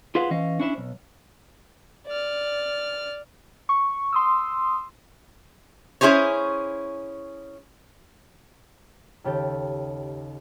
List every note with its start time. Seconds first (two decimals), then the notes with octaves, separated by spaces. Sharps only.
0.15 F4 G#4 B4 C5 F5 F#5
0.31 E3 C#4 D#5 F5
0.60 C#4 D4 E4 C5 D#5 E5
0.78 B1
2.07 D5 F6
3.69 C#6
4.13 C6 D#6 E6
6.01 C#4 E4 G#4 C5 C#5
9.24 D#2 C#3 G4 A4 G6